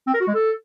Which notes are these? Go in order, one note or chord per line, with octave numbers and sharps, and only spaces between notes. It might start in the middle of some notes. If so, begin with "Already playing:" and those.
C4
A#4
F#4
G#3
A4